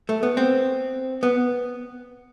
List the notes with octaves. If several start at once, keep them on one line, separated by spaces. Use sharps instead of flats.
A3
B3
C4
B3